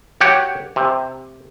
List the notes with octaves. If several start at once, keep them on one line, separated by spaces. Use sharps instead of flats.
F#4 G4 C#5 F#5 G5
C3